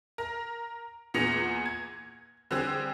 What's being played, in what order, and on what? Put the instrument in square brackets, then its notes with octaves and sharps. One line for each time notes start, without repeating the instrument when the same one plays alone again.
[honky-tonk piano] A#4
E2 A#2 B3 G#4 A#6 F7
G#6
D3 G3 C4 G#4